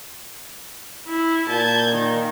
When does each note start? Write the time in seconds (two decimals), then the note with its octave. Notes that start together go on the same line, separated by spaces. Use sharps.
1.07 E4
1.49 A#2 A5 G6 G#6
1.92 D#3